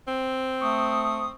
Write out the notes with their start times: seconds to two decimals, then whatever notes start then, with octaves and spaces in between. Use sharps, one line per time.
0.08 C4
0.61 A3 C#6 D#6